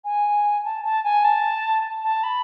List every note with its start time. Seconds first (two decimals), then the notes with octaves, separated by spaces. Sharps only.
0.04 G#5
0.65 A5
0.85 A5
1.04 G#5
1.24 A5
2.04 A5
2.24 B5